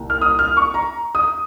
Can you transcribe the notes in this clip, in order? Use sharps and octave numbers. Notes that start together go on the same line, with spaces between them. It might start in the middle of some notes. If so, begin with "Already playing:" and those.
Already playing: C2 A#2
F6
D#6
F6
C#6
A#5
D#6